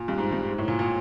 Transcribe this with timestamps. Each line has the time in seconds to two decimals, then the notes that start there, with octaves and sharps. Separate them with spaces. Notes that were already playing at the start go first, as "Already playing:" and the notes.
Already playing: A#2
0.08 G2
0.18 G#2
0.32 G2
0.48 G#2
0.58 A2
0.68 A#2
0.79 A#2